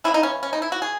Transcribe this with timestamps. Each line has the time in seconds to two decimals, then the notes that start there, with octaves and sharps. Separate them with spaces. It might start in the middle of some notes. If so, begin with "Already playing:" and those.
0.04 C#3 E3 G#3 E4
0.14 D#4
0.23 C#4
0.43 C#4
0.53 D#4
0.62 E4
0.72 F#4
0.82 G#4